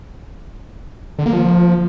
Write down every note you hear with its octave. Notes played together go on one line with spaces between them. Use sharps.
D3
A#3
F3